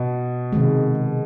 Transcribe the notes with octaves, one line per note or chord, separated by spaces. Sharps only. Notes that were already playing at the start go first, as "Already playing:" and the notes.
Already playing: B2
C3 D#3 G#3